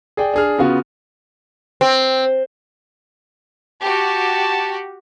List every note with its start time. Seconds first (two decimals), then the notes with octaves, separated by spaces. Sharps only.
0.17 G#4 D5 G5
0.34 D4 G#4 F6
0.58 C#3 B3 F4 F#4
1.81 C4
3.83 F#4 G4 A5